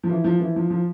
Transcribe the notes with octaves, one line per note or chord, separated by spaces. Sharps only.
F3
E3
F3
E3
F3
F3